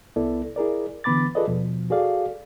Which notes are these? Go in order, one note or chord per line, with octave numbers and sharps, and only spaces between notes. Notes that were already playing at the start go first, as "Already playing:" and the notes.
C2 B3 E4 A4 D5
E4 G#4 A#4 D5
D3 E3 B3 B5 D6 A6
F4 G#4 A4 B4 D5 D#5
D#2 B2 F3
F#4 G#4 A4 D5 F5